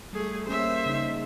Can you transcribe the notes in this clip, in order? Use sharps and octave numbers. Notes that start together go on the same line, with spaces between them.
G3 A3 G#4
A#3 C#4 G#4 C5 E5
C#3 D#4